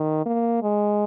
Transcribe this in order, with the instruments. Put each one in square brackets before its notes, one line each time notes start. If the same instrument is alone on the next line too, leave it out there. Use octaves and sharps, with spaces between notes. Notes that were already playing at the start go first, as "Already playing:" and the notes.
Already playing: [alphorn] D#3
A#3
G#3